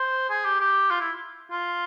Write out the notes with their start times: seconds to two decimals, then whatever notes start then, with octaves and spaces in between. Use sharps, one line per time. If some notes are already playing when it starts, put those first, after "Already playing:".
Already playing: C5
0.30 G#4
0.45 G4
0.61 G4
0.91 F4
1.01 E4
1.51 F4